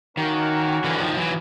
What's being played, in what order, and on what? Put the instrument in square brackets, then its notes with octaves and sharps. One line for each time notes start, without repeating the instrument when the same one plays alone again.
[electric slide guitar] D#3 [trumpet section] A#3 C#4 F#4 A#4
[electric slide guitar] D3 E3
D#3 F3
E3 F#3